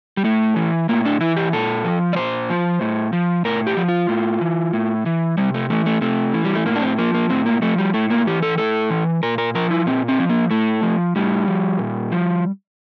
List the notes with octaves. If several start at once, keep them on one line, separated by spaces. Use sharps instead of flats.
G3
A2 A3
E3
A2 A#3
D4
E3 E4
G4
A#2 A4
F3
D5
A#2 C5
F3
A2
F3
A2 A#4
G4
F3
F4
A2
E3
A2
E3
C3 G3
A3
E3 A3
A3
C3 A3
E3
G3
A3
A2 A#3
D4
C4
F3 A#3
A#3
A2 C4
A#3
F3 A3
G3
A2 A3
A#3
E3 G4
A4
A2 A4
E3
A#2 A#4
A#4
F3 A#4
E4
A#2 C4
C4
F3
A#3
A2 A3
F3
A2 G3
F3
A#2
F3